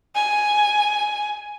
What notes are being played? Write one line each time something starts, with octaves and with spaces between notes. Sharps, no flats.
G#5